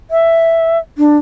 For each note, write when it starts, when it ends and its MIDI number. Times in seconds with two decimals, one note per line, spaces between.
0.11 0.78 76
0.98 1.17 62